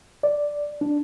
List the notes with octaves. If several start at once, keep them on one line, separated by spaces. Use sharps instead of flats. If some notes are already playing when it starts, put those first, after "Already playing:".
D5
D4